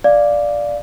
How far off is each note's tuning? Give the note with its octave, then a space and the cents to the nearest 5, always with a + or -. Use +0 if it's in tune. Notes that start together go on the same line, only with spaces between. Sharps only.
D5 +0 F5 +0